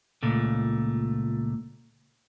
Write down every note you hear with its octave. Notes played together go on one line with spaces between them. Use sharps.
C#2 A#2 A3